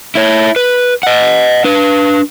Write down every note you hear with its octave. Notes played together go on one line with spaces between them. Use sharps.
E4 C#5
B4
D#5 F#5
D4 B4